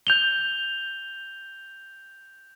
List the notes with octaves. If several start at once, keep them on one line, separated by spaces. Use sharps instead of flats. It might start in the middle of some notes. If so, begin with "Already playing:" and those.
G6 F7 G7